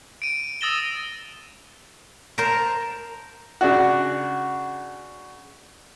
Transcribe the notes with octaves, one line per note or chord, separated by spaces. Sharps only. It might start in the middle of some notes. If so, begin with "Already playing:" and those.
D7 D#7
D#6 E6 A6 A#6 E7 G7
A#4 C5 A5 A#5
C#3 D4 F#4